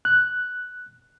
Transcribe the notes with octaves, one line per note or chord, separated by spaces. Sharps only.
F#6